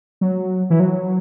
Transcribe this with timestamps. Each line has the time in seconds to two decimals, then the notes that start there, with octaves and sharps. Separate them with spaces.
0.21 F#3
0.70 E3
0.80 F#3